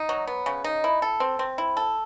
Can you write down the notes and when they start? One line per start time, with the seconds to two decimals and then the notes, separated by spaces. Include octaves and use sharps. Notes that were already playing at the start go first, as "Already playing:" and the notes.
Already playing: D#4
0.09 F#3
0.27 B3
0.46 C#3
0.64 D#4
0.84 E4
1.02 A4
1.20 C4
1.39 C4
1.58 E4
1.77 A4